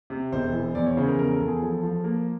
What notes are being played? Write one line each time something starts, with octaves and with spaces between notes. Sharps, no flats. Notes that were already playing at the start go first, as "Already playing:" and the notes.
C3
E1 C5
E3
E2 D5
C#5
C#3 C5
A#4
E2 A#4
A4
E2
G#4
F3 A4
F3
A#3